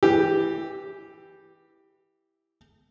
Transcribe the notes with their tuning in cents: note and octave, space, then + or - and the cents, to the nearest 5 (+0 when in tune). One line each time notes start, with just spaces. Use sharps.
E3 -5 G4 +0